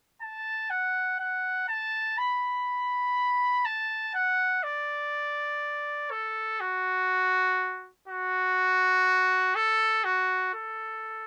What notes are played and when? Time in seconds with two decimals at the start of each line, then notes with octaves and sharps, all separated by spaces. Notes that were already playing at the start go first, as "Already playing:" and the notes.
0.21 A5
0.70 F#5
1.19 F#5
1.68 A5
2.18 B5
3.65 A5
4.14 F#5
4.63 D5
6.11 A4
6.60 F#4
8.08 F#4
9.55 A4
10.04 F#4
10.54 A4